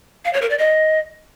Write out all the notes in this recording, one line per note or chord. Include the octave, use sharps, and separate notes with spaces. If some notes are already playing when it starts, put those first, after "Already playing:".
F5
C#5
A#4
D5
D#5